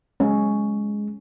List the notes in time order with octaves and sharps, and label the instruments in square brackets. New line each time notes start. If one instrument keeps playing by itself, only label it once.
[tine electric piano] G#3 [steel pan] C#4